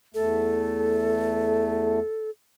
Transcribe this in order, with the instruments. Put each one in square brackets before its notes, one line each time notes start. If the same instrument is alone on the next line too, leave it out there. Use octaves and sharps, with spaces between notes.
[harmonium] E2 A3 [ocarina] A4